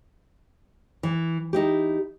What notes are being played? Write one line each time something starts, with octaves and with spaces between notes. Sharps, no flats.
E3
D#4 E4 G4